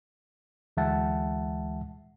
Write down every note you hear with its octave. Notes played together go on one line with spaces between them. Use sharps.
D2 E3 G#3 E5 F#5 A5